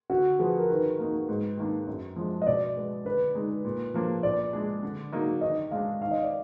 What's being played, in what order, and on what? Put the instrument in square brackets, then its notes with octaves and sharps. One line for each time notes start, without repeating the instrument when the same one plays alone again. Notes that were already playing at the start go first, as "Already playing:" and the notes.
[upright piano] D3 [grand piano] F#4
[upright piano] F3 B3 [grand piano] G#4
[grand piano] A#4
[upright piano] D#3 [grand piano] B4
[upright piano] A#3 D#4
G#2
D#3 A#3 D4
F#2
F3 G#3 D4
[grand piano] D#5
[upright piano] B2 [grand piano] D5
[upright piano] G#3 B3
[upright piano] D3 [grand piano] B4
[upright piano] G#3 D#4
A#2
F3 A#3 D4
[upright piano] A#2 [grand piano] D5
[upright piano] G#3 D4
D3
F#3 A#3 D#4
[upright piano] D#3 [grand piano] D#5
[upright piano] G#3 D4 [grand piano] F5
[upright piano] D#3 [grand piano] F5
[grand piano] D#5
D5